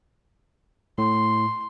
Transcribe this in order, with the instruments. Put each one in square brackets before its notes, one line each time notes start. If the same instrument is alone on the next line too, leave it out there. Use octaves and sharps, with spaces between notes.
[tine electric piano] A2 [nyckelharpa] C6